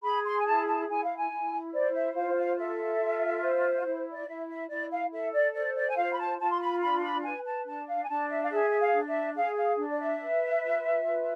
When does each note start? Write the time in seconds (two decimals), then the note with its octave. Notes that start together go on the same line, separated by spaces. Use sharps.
0.03 G#4 B5
0.25 C6
0.38 G#5
0.45 E4 A5
0.67 A5
0.88 E4 G#5
1.02 F5
1.16 G#5
1.31 E4
1.73 C5 D5
1.94 E5
2.15 F4 F5
2.36 F5
2.57 A4 E5
3.00 F4
3.42 C5
3.85 E4
4.13 D5
4.27 E4 E5
4.49 E5
4.69 E4 D5
4.90 F5
5.12 A4 E5
5.33 D5
5.54 C5 D5
5.76 D5
5.89 G#5
5.96 F4 F5
6.12 B5
6.18 A5
6.39 F4 A5
6.50 C6
6.61 B5
6.81 D4 B5
6.98 C6
7.02 B5
7.23 B4 G#5
7.45 A5
7.66 D4 A5
7.88 F5
8.02 G#5
8.09 D4 A5
8.29 E5
8.43 F5
8.50 G#4 E5
8.69 E5
8.79 F5
8.93 D4
9.08 E5
9.35 G#4 F5
9.57 F5
9.77 D4
9.90 D5
9.99 E5
10.21 B4
10.63 F4
11.06 B4